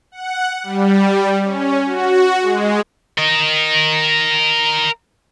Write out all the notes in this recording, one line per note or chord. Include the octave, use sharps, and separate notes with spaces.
F#5
G3
C#4
F#4
G#3
A#4 D#5